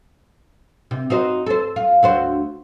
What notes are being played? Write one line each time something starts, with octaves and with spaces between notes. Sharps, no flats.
C3
D#4 F#4 C5
A4 C5
F4
D2 F#4 C5